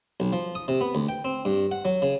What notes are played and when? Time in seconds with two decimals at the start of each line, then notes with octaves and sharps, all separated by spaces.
0.20 B1
0.33 F3
0.55 D#6
0.68 C3
0.81 B3
0.95 D2
1.09 G5
1.25 C4
1.45 G2
1.71 F#5
1.85 F#3
2.02 C#3